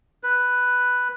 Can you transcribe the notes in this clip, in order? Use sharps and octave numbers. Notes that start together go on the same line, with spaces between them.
B4